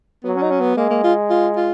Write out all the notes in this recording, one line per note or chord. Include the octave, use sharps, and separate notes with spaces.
F#3 B3
C#4
D#4
C#4
B3
G#3 A#3
A#3
F4
F4
F4